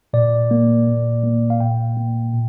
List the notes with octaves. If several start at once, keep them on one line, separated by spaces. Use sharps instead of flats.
A#2 D5
A#3
A#2
A#3
F5
A#2 G5
A#3
A#2